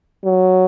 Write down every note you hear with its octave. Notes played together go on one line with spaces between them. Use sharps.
F#3